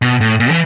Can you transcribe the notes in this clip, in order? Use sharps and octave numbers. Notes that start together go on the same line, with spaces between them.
B2
A2
A#2
E3